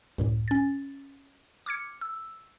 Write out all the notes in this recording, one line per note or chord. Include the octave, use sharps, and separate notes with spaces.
C#2 F#2 A2
C#4 A6
D6 F6 G#6 C#7
E6